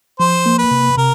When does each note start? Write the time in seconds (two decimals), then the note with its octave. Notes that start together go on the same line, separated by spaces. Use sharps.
0.19 F3 C5
0.46 A#3
0.58 B4
0.71 C3
0.97 C3 A#4